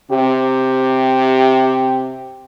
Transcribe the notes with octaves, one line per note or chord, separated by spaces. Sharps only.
C3 G4